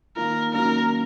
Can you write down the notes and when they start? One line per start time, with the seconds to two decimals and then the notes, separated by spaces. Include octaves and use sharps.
0.16 D#3 A#3 F4 A#4
0.54 D#3 F#3 A#3 C#4 A#4